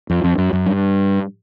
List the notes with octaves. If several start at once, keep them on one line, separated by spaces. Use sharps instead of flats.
F2
F2
F#2
F#2
G2